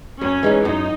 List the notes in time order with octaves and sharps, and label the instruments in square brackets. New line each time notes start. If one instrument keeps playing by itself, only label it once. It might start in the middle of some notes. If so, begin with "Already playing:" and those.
[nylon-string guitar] F#2 [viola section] C#4
[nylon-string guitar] E3 G#3 D#4
[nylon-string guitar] F#2 [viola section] D#4